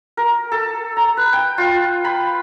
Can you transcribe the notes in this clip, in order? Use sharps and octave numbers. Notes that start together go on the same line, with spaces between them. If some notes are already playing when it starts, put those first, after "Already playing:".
A#4
A4
A#5
B4
G5
F4
B5